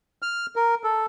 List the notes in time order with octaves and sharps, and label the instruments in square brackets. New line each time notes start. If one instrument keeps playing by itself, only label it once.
[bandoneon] F6
A#4
A4